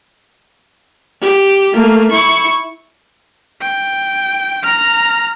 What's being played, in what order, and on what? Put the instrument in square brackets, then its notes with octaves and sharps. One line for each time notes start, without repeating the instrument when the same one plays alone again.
[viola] G4
A3 A#3
E4 C#6
[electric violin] G5
A#5 F6